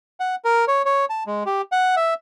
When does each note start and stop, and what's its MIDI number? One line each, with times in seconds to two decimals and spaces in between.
0.20 0.35 78
0.45 0.65 70
0.68 0.82 73
0.85 1.05 73
1.10 1.23 81
1.27 1.43 56
1.46 1.62 67
1.72 1.95 78
1.96 2.14 76